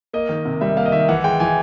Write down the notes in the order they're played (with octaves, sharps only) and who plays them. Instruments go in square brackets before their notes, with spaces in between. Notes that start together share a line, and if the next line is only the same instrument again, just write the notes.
[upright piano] A#3 [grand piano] D#5
[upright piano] D#3
C3
[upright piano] G3 [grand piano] E5
[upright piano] A#3 [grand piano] F5
[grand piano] D#5
[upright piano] D#3 [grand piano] E5
[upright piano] E3 [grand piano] F#5
[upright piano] G#3 [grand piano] G5
[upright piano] E3 [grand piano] G#5